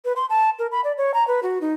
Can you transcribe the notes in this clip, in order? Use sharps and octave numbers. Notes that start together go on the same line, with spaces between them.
B4
C6
A5
A#4
B5
D5
C#5
A#5
B4
F#4
D#4